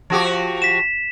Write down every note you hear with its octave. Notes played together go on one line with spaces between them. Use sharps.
F3 F#4 G4
B6 E7